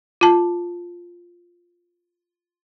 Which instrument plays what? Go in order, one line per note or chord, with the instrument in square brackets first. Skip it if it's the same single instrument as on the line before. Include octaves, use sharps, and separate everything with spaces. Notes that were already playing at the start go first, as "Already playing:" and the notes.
[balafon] F4 A5